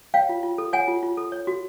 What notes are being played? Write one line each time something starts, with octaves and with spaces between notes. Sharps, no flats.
C#5 F5 G5
F4
F4
A4
C#5 F#5 G#5
F4
F4
A4
C#5
F#4